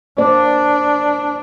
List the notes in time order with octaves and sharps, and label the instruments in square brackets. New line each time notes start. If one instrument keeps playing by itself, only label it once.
[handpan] A#3 C5 D5 [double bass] D4